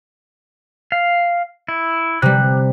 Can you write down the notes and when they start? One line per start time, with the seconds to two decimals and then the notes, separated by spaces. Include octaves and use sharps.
0.92 F5
1.68 E4
2.22 C3 G3 F#6